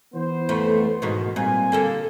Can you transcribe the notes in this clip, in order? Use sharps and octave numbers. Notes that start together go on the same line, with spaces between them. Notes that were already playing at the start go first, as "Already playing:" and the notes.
E3 B3 C5
F2 A3
G#2 B2 D#3
A#2 G3 C4 G#5
D3 A#3 A4